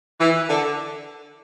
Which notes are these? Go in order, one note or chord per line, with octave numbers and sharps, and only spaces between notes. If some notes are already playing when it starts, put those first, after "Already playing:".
E3
D3